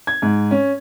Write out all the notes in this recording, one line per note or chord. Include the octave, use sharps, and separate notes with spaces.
G#6
G#2
C#4